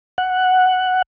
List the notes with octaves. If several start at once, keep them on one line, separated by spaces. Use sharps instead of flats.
F#5